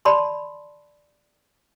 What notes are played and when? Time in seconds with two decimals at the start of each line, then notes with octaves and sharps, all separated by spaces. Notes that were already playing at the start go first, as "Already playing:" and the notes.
0.05 D5 A5 B5 C6